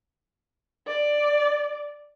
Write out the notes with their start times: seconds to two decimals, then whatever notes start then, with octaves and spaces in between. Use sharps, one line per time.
0.87 D5